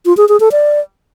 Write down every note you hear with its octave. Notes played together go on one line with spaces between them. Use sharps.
F4
G#4
G#4
A4
D5